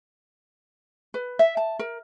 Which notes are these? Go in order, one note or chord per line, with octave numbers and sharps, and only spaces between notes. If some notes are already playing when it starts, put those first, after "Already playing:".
B4
E5
A5
A#4